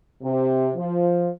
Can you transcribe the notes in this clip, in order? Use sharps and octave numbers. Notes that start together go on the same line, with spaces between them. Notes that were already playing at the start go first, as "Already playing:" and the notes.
C3
F3